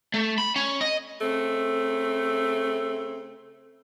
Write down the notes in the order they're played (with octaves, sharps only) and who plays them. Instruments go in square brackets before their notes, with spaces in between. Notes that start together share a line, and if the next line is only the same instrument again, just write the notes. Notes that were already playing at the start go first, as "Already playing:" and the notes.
[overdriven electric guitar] A3
B5
C#4
D#5
[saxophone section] C#3 A3 C4